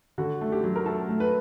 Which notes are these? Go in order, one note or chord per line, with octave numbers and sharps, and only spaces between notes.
D3 F#4
A3
G4
F#3
A#4
A3 A4
A3
B4